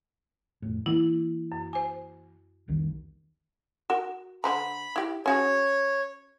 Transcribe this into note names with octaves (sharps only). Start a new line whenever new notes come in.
F1 A2
E3 A#3 E4
F#2
C5 G#5
F1 C2 D#3
F#4 A#4
D3 C5 A#5 B5
E4 G4
C#4 F#4 G#4 C#5